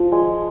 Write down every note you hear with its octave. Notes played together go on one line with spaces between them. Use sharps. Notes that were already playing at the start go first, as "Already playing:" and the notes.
Already playing: F3
G#3